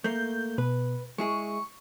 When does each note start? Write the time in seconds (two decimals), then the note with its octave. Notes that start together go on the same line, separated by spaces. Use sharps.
0.04 A3 A#3 G6
0.58 B2 B4
1.18 G#3 E4 G#4 C#6